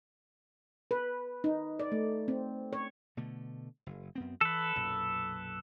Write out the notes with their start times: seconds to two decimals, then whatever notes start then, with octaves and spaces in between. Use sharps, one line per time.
0.91 B4
1.44 D#4
1.79 D5
1.92 A3
2.28 C4
2.73 C#5
3.17 B2 D3 A3
3.86 F#1
4.15 F#2 B3 C4
4.41 E3 A4 B4
4.76 B1 F#2 A#2